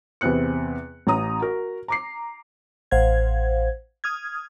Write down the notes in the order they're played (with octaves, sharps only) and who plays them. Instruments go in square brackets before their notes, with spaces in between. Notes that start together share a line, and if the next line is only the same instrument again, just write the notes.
[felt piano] E2 C3 B3 C4 F#6 C#7
A1 C#4 A#5 D#6
F#4 A#4
A#5 D6 C7
[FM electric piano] A1 C5 F5 F#5 G#6
D#6 F6 G#6